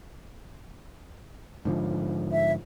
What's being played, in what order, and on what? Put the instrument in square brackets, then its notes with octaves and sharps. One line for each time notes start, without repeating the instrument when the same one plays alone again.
[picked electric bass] G#2 D3 F3
[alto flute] E5